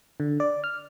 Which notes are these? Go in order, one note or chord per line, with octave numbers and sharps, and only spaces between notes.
D3
D5
F6